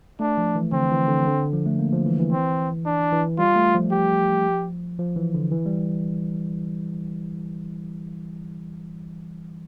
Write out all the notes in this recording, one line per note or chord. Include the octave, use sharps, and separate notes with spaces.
A3 D4
F3
E3
D3 C4
E3
D3
D3
F3
A3
A#3
F3
E3
E3
C4
D4
E3
G3 F4
A3
F3
G4
F3
E3
D3
E3
G3